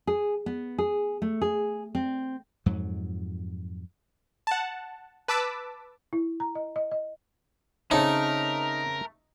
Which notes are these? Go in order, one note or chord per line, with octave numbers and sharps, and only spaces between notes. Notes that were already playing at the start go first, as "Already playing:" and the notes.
G#4
B3
G#4
A3
G#4
C4
F2 G#2 F#3
F#5 A5
B4 A5 D6 E6 B6
E4
A#5
D#5
D#5
D#5
C#3 A3 C4 D#4 A4 A#4 C#5